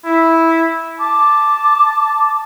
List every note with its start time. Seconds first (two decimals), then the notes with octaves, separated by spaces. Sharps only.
0.05 E4
1.00 A5 D6